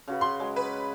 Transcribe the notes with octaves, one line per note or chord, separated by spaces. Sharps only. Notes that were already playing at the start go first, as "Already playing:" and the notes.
C#3 F#4 B4
G#4 C6
F#3 G#3 G#4
B4